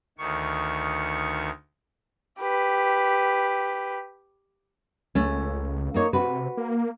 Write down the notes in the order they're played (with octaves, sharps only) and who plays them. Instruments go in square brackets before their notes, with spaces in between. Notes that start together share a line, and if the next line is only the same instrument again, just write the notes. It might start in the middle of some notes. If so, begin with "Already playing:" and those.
[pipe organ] D2 D#3 C#6
[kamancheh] G4 B4
[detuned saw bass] C#2 [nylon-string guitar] A3 C#4
[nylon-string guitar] A#3 D#4 C#5
[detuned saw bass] C3 [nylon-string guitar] F#4 B4
[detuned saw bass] A#3